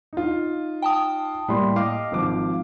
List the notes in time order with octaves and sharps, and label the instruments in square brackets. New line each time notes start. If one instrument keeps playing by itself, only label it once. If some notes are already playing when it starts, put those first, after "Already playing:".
[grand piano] D#4 F4
[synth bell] G5 A5 D#6
[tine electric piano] A2 G3 A#3 [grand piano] B5 C6
[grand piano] D#5 D6 [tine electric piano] F5
[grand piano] G#1 F3 D6